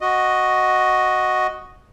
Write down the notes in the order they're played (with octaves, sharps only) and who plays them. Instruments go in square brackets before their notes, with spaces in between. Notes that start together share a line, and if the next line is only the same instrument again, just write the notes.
[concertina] F#4 D#5